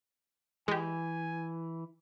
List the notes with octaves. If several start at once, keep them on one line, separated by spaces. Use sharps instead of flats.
E3 G#3 G4 G#5